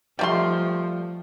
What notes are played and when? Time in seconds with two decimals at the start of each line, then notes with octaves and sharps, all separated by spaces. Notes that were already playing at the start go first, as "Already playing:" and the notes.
0.19 F3 G3 A3 C6